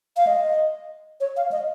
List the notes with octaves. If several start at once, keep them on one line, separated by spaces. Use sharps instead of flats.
F5
D#5
C#5
F5
D#5